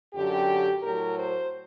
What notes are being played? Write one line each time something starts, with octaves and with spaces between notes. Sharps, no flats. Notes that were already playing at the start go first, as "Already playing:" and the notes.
F#2 D3 F#3 G4
A2 F#3 A#4
C5